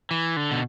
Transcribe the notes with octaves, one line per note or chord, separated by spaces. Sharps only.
E3
D3
B2